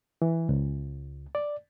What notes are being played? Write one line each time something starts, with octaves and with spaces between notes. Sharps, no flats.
E3
C#2
D5